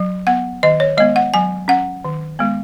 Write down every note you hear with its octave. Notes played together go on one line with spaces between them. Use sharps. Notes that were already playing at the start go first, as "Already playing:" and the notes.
Already playing: F#3
B3 F#5
D#3 D#5
C#5
G#3 B3 D#5
F#5
F#3 G#5
C#4 F#5
D#3
G#3 B3